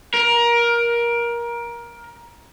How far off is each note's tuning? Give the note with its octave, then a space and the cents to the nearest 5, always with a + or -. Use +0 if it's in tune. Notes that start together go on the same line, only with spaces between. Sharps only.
A#4 +20